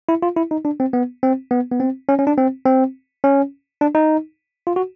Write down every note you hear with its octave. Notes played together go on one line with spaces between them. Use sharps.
E4
F4
E4
D#4
D4
C4
B3
C4
B3
B3
C4
C#4
C#4
D4
C4
C4
C#4
D4
D#4
F4
F#4